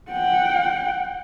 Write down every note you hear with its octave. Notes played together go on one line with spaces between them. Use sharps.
F#5 G5